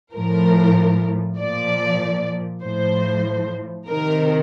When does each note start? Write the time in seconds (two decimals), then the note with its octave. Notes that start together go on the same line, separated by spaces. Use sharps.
0.14 A2 F3 A#4
1.39 A#2 F3 D5
2.63 A2 F3 C5
3.88 C3 D#3 A#4